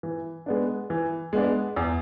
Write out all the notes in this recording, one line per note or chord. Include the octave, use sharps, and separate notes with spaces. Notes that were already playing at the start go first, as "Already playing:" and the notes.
E3
G#3 B3 D4
E3
G#3 B3 D4
E2